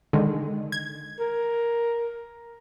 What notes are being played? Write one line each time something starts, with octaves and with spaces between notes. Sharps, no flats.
D3 D#3 G#3
G#6
A#4